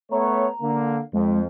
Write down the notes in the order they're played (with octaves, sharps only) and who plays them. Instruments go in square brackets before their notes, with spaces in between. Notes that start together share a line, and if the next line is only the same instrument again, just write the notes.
[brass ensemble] A3 B3 C#5 [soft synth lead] A#5
[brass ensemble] D3 A#3
[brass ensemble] F2 [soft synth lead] G#3